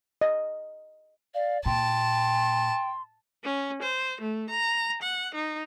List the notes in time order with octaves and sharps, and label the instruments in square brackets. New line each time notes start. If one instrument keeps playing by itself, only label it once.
[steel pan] D#5
[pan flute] D5 [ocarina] F5
[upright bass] A#2 [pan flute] G5 [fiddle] A5 [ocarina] C6
[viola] C#4
C5
A3
A#5
F#5
D#4